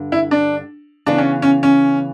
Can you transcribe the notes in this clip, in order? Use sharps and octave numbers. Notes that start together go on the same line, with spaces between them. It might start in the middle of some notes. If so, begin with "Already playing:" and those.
Already playing: G2 D3
E4
D4
C#3 E3 B3 D4
C#4
C#4
C#4